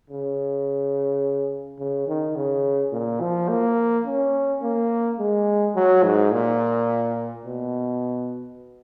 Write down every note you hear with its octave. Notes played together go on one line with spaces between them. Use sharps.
C#3
C#3
D#3
C#3
A#2
F3
A#3
C#4
A#3
G#3
F#3
G#2
A#2
B2